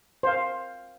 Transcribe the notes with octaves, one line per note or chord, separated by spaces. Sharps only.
C5 F5